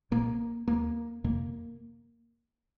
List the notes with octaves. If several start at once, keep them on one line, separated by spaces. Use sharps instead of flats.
C2 A#2 A#3
D#2 A#3
F2 C3 A#3